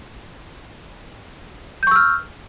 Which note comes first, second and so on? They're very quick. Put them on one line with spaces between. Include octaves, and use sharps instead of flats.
G6 C#6 E6 F6